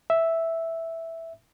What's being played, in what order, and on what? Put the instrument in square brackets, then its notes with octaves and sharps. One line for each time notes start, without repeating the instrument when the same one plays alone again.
[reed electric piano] E5